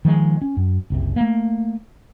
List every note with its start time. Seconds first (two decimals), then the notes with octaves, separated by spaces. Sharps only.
0.05 D#3 F3 G#3
0.42 C#4
0.57 F#2
0.90 F#1 C2 C3
1.16 A3 A#3